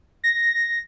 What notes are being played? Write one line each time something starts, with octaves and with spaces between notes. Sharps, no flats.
A#6